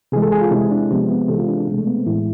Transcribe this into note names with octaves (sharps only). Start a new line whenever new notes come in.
C3 E3 G#3 G#4
A4
G#4
F4
C3 G#3 E4
D4
C3 F3 G#3 B3
B3
C3 E3 G#3 A4
F4
D4
D4
B2 G#3
A3
B3
C4
A2 E3 G#3 E4